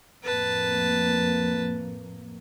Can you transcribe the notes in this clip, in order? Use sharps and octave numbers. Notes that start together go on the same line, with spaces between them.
F2 A2 A#3 B4 A5